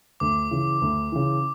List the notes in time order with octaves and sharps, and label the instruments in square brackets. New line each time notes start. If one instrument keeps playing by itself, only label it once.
[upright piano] D2 [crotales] D6
[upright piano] C#3 E3
D2
C#3 E3